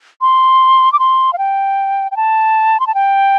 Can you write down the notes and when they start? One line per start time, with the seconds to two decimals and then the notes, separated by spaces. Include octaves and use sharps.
0.21 C6
0.93 D6
0.99 C6
1.33 F5
1.38 G5
2.11 G5
2.17 A5
2.80 C6
2.87 A5
2.95 G5